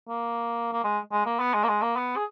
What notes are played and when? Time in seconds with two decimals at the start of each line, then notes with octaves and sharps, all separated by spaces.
0.08 A#3
0.73 A#3
0.84 G#3
1.12 G#3
1.26 A#3
1.39 B3
1.54 G#3
1.64 A#3
1.68 G#3
1.82 A#3
1.97 B3
2.16 G#4